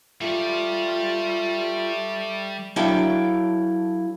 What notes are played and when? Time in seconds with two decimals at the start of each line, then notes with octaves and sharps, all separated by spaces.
0.21 G3 A3 F4 D5
2.76 F#3 D4 E4 A4 F5 G5